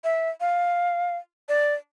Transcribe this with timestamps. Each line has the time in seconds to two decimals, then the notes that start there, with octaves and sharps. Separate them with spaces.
0.04 E5
0.41 F5
1.49 D5